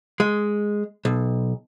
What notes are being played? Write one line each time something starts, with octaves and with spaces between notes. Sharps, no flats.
G#3
B1